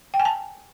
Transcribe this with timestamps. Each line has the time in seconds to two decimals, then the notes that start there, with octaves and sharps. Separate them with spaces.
0.14 G5
0.20 G#5
0.25 A5